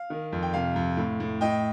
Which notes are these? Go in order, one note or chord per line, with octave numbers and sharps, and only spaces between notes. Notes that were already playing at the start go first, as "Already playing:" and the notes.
Already playing: F5
D#3
F2
G5
C3 F5
F2
A2
A2
A2 D#5 G5